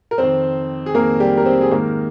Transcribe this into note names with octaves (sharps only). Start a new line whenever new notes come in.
A#4
F2 D#3 C4 C5
G#4
F2 D#3 A#3 A#4
G3 G4
A#4
C4 C5
G#4
G#2 D#3 A#3 A#4